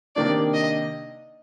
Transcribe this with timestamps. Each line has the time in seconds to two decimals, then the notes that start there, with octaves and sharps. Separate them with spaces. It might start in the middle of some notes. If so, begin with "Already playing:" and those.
0.16 C3 D#3 A#3 D4 D5
0.54 D#5